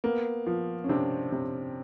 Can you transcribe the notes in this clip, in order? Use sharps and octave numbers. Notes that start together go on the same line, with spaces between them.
A#3 B3
F3
C#4
C3 C4 D4
C3